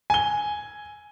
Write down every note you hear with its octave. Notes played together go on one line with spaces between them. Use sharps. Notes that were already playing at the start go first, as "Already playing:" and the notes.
G#5 G7